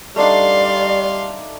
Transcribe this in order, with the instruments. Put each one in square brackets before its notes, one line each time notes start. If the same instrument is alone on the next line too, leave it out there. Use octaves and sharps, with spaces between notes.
[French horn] G3 [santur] A3 D4 D#4 [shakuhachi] D5 [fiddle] F5 C6